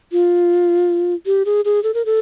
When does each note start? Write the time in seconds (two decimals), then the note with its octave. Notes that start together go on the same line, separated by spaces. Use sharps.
0.12 F4
1.26 G4
1.46 G#4
1.65 G#4
1.83 A4
1.94 A#4
2.06 A4